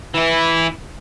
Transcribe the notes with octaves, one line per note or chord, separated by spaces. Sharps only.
E3 E4